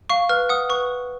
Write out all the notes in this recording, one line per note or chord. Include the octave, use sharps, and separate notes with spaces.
F5 C#6
B4 F6
F#5 D#6
B4 C#6